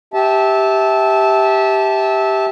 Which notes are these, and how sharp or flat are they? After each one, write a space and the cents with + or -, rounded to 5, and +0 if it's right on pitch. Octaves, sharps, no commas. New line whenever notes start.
G4 +0 E5 -20 A5 -15